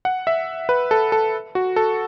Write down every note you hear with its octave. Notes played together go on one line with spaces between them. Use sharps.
F#5
E5
B4
A4
A4
F#4
A4